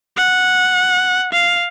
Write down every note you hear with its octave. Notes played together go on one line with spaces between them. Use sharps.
F#5
F5